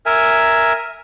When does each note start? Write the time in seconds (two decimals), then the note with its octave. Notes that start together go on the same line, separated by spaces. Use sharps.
0.06 A#4 E5 G#5